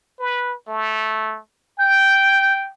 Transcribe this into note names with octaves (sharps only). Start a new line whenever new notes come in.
B4
A3
G5 G6